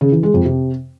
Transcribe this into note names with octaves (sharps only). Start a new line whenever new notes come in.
C#3
E3
G#3
F2
C3